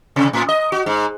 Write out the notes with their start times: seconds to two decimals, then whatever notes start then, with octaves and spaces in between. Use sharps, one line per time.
0.16 C3
0.33 A2
0.49 D#5
0.72 F#4
0.86 G#2